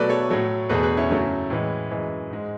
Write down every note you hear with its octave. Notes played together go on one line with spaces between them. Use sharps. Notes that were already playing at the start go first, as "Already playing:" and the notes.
Already playing: B2 F#3 A3 B4 D5
A4 C#5
A2 F#3 A3
E2 B2 A3 G#4 B4
G#4 B4
C#4 E4
F#2 C#3 F#3 A3
A2 E3 G#3
F#2 E3 G#3
G#2 G#3